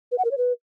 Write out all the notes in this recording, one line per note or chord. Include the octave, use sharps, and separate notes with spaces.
B4
F#5
A#4
C#5
B4